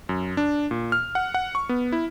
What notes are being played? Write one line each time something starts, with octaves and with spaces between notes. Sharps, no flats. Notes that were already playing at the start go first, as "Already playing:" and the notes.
F#2
D4
A#2
F6
F#5
F#5
C#6
B3
E4